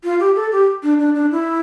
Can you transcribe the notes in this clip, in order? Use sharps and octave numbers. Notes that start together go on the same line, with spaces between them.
F4
G4
A4
G4
D4
D4
D4
E4